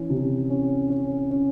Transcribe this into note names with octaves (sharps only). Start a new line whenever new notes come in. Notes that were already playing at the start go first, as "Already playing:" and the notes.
Already playing: E3 C#4
C3
C#4
C#4
C#4